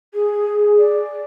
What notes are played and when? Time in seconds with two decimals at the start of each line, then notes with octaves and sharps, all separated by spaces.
0.14 G#4
0.78 D5